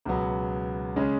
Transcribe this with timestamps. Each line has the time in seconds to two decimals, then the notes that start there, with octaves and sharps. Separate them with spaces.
0.06 C#2 B2 F#3 B3
0.96 C#3 G#3 C#4